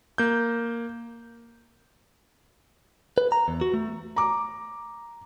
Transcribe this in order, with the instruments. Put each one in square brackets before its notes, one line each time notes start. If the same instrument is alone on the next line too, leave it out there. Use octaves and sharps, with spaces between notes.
[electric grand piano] A#3 G6
[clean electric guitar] B4
A#5
E2
F#4
A3
[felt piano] A#5 D6